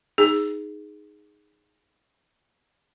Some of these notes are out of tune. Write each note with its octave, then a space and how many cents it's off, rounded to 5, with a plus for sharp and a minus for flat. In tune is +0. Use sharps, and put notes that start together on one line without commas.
D#4 +0 G#4 +0